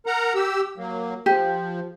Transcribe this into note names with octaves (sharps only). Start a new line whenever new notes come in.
A#4 F#5 A#5
G4 E6
F#3 A#3
F3 G4